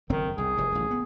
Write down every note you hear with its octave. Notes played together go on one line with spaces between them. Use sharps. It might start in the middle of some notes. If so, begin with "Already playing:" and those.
F#1 F2 D#3 C4
C2 G#4
F1 F2 C3
A1 D2
B3